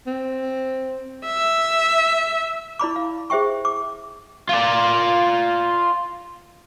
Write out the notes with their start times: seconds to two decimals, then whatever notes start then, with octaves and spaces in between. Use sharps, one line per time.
0.07 C4
1.26 E5
2.79 E4 D5 B5 D6
2.96 F5
3.30 G#4 C5 E5 G5 C#6
3.65 D6
4.49 F4 D5